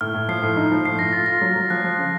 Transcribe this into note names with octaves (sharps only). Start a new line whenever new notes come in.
A2 F6
A2
F3 C7
A2
D#4
F3
A2 C7
A2 A#6
F4 A6
F4 A#6
F#3
F#3
F3 F#6
F3
C#3